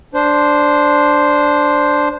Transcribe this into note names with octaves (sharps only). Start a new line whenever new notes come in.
D4 C5